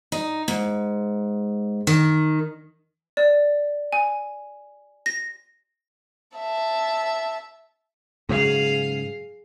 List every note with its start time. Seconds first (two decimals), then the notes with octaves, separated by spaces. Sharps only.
0.12 D#4
0.48 G#2
1.87 D#3
3.17 D5
3.93 G#5
5.06 A#6
6.37 E5 A5
8.29 G#2 C#3 F#3 G#4 F5